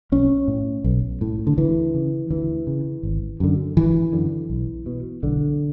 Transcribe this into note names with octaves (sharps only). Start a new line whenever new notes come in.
B1 C#4
A2
B1
A2
D3
D2 E3
C#3
D2 E3
C#3
G#1
F#2 D3
G#1 E3
F#2 D3
B1
B2
B1 D3